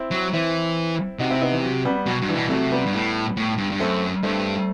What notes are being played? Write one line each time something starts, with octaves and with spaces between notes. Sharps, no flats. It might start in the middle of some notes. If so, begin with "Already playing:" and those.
Already playing: C4 E4
F#3
E3 C4 E4
C3 D#4 F#4
C4 E4
B3 D#4
E3
F#3
G3 B3
B2 F#3
G2
E3 G3
B2
C3 F#3 A3
G3 B3
G2
A2
A2
G2
G2
F#2 A3 C4
G2 A3 C4